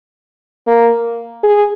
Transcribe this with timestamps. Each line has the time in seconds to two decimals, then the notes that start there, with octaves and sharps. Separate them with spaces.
0.67 A#3
1.43 G#4